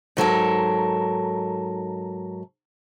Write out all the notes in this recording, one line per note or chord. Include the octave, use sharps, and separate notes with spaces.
G#2 F#3 A4 A#4